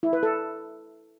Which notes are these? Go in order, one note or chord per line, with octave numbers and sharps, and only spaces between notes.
E4
B4
A4